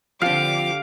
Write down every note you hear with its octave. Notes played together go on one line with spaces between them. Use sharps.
D3 F3 C4 G4 F5 D6